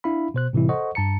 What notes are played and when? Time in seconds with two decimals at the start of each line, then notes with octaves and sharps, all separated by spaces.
0.04 D4 E4 E5 F5 B5
0.34 B2 C5 F#6
0.53 A2 C3 E3 G3 E4
0.69 A4 C5 D#5 F#5 C#6
0.95 G2 A5 A#5 C#7